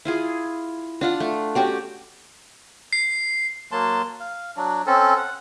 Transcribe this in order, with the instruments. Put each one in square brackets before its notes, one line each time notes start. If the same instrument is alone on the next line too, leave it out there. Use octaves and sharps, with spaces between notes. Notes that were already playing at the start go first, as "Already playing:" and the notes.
[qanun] E4 F4 G#4
D4 F4 F#5
A3
C#4 F#4 G4 D5
[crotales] C7
[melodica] F#3 A#3 A5 C6
F5
F#3 D4
C4 C#4 A4
F#5